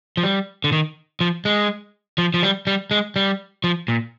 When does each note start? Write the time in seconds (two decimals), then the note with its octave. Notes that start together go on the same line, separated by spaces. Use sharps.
0.17 F3
0.24 G3
0.64 D3
0.72 D#3
1.21 F3
1.45 G#3
2.18 F3
2.34 F3
2.43 G3
2.67 G3
2.91 G#3
3.16 G3
3.64 F3
3.88 A#2